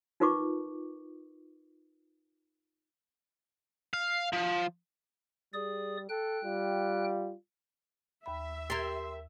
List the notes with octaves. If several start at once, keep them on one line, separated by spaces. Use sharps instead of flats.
D#4 F4 A#4 B4 C#6 D6
F5
F3
G3 G#4 D5 D#6
A4 G5 F#6
G3 F4
D#2 E5 B5
G4 A#4 C6 G#6 A6